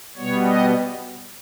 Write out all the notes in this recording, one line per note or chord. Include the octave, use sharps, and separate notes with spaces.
B2 G3 B3 C#5
D#5